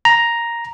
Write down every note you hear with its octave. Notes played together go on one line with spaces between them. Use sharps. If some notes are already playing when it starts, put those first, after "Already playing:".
A#5